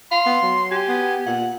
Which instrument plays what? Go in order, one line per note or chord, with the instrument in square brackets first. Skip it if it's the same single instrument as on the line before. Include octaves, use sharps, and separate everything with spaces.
[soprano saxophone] F5 [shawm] C6
[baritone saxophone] B3
F#3
[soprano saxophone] G4 [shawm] G#5
[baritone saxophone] B3
[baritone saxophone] A#2 [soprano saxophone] F#5